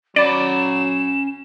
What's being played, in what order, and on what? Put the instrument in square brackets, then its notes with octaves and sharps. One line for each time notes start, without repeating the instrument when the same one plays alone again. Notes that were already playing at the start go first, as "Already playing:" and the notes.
[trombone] F#3 [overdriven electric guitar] C#4 B5 [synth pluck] D5 [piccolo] E7